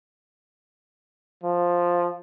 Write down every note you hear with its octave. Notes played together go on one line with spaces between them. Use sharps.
F3